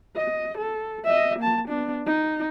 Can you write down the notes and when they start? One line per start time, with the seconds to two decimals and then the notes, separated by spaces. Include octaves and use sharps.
0.17 D#5
0.58 A4
1.04 D#5 E5
1.39 A#3 A5
1.68 B3 D4
2.06 D#4